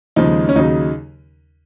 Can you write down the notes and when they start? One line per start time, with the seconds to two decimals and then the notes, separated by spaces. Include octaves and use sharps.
0.16 D#2 C#3 F3 G#3 D#4
0.49 C#4
0.56 D#2 C#3 F#3 D#4